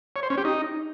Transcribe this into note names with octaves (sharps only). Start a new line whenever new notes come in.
C#5
C5
C#4
G4
D#4